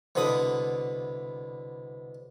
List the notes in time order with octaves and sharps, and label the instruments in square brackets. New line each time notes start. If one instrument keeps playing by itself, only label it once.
[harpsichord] C2 B2 D3 B5 D#6